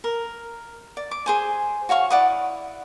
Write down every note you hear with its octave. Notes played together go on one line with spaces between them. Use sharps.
A#4
D5
D6
G#4 C5 G#5
F#4 C#5 F5 C#6
E4 D5 F#5 D#6